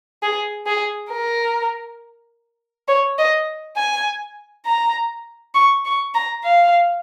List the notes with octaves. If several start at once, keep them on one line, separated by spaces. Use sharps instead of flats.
G#4
G#4
A#4
C#5
D#5
G#5
A#5
C#6
C#6
A#5
F5